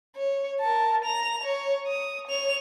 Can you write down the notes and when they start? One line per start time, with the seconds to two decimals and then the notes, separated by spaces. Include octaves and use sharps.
0.16 C#5
0.61 A#4 A5
1.05 A#5 F7
1.44 C#5
1.87 D#6
2.28 C#5 F7